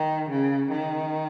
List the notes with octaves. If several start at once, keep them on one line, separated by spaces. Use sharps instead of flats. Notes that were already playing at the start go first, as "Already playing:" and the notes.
Already playing: D#3
C#3
D#3